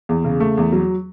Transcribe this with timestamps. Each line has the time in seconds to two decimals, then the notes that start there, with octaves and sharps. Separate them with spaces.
0.09 E2
0.24 C#3
0.40 A3
0.57 E2
0.73 F#3